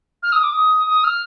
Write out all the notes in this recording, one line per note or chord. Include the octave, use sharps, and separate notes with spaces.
F6
D#6
D6
D#6
D#6
F6